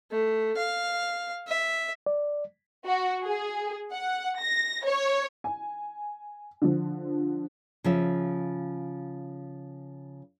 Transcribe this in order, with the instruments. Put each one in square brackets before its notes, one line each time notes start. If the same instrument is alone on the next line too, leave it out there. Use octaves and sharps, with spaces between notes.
[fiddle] A3
F5
E5
[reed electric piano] D5
[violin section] F#4
G#4
F#5
A#6
C#5
[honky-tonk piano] G#5
D3 F3
[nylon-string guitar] C#3 F3 E5